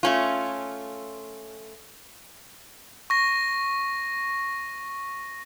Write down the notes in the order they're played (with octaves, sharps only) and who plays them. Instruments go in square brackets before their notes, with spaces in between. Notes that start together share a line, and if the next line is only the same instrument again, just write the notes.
[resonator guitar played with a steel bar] A3 C#4 F4
[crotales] C#6 A#6